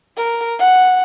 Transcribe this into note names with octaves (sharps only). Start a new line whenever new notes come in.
A#4
F#5